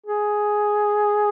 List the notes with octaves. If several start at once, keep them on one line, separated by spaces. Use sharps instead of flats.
G#4